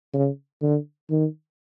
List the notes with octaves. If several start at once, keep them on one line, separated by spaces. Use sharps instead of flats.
C#3
D3
D#3